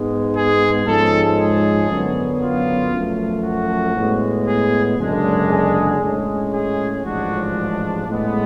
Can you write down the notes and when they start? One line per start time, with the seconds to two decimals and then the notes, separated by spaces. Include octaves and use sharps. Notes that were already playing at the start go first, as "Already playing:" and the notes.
Already playing: G#2 G#3 B3
0.34 G#4
0.86 G#2 F3 G#3 C#4 A4
1.38 G#4
1.89 F#2 D3 F#3 B3
2.40 F4
2.92 F#2 F3 A3
3.43 F#4
3.95 A2 G#3 B3
4.46 G#4
4.97 F#1 F#2 D3 G#3 D4
5.49 G#4
6.00 A2 G#3 C#4
6.52 G#4
7.03 A1 G#2 F3 G#3 D4 F#4
8.07 A2 G#3 B3